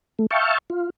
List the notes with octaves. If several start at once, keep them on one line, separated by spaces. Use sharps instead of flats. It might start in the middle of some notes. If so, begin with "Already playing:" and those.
A3
E5 F5 G5 A5 C#6
F4